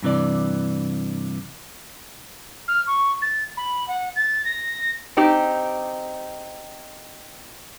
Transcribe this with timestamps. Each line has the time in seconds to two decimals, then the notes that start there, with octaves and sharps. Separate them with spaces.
0.02 G2 C3 E3 D5
2.68 F6
2.87 C#6
3.22 A6
3.57 B5
3.88 F#5
4.16 A6
4.45 A#6
5.17 C4 D#4 G4